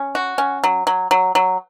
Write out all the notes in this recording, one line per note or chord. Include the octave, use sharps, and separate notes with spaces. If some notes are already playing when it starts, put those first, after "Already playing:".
Already playing: C#4
F#4
C#4
F#3
F#3
F#3
F#3